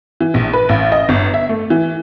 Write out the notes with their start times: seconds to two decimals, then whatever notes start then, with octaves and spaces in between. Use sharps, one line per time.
0.21 E3
0.34 A#1
0.53 B4
0.69 A1
0.92 D#5
1.09 G1
1.34 E5
1.49 A3
1.70 E3